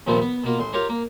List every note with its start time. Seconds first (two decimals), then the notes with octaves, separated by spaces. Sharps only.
0.07 D#2 A#2 F3 A3 B3 C4
0.21 B3
0.44 B2 A#3 F4
0.59 A1 C6
0.73 F4 G4 A#4 C#5
0.89 A#3